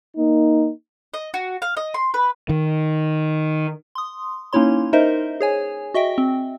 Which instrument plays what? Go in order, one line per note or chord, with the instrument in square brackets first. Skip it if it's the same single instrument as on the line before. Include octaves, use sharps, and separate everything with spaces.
[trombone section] A#3 D#4
[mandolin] D#5
F#4
F5
D#5
C6
B4
[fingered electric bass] D#3
[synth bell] C6 D#6
A#3 C#4 D#4 E4 C#5 C6
D#4 A#4 C5 D#5 E5
G#4 C#5 G#5
F#4 D#5 E5 G5
C4